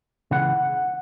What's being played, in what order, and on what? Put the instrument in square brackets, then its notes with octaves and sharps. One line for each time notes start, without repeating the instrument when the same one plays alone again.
[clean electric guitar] C#2 C#3 E3 F#5